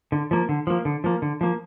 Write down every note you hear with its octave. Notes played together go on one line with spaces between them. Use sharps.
D3
F3 A#3
D3
F3 A#3
D3
F3 A#3
D3
F3 A#3